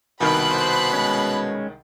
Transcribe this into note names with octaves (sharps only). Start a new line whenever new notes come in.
C2 B2 D#3 B5 F6 F#6
C5
G#3 C#4